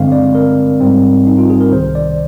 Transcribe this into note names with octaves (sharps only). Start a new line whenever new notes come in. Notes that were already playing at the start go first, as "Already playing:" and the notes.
Already playing: G2 D3 G#3 C4 F5
D5
A#4
G#2 G3 C4
D#4
F4
G#4
A#4
C2 C3 D#3 C5
D5